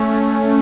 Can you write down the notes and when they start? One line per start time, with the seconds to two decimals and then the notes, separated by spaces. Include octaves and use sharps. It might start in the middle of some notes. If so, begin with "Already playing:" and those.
Already playing: A3 C#4